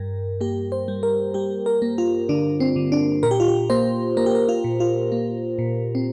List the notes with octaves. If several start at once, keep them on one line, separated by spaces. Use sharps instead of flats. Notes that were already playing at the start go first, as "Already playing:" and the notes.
Already playing: G2 G3 A#4
A#3 G4
C5
G3
A#4
G3 G4
A#4
A#3
F4
D3 D4
C4
D3
D4
A#2 A#4
G4
F4
G4
A#3 C5
A#3 A#4
G4
A#4
F4
A#2
F4
A#3
A#2
C4